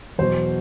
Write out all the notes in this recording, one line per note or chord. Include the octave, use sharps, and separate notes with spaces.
E2 B2 F#3 C5